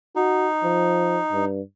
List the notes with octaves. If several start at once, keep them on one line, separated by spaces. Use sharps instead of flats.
D#4 F#4
F3
G2